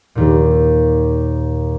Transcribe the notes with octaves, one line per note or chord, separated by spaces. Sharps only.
D#2 A#2